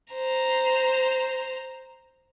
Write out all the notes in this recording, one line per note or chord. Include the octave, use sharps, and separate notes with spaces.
C5 A#5